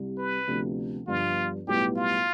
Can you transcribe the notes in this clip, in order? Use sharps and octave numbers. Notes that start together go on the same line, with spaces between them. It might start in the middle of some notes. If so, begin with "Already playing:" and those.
Already playing: C2 C3 G3
B4
D2 C3 F3 B3 D4
G1 G2 F3 B3 F4
B1 A2 G3 B3 E4 G4
F4